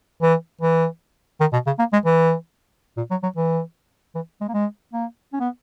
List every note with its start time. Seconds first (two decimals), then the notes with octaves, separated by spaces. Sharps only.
0.22 E3
0.61 E3
1.41 D#3
1.53 B2
1.66 C#3
1.79 A#3
1.93 G#3
2.05 E3
2.97 A#2
3.11 F#3
3.23 F#3
3.37 E3
4.15 E3
4.41 G#3
4.49 A#3
4.54 G#3
4.93 A#3
5.33 C#4
5.40 B3